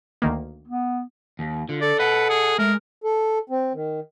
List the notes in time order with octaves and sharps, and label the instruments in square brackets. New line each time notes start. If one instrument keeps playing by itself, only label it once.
[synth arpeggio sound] D2 D#3 A#3
[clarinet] B3
[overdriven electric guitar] D#2
[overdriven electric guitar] D3 [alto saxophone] F4
[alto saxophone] A4 [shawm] D5
[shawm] B4 [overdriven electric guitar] D#5 F#5
[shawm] G#4
[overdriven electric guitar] G#3 [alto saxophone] A3 [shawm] A#4
[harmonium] A4
C4
D#3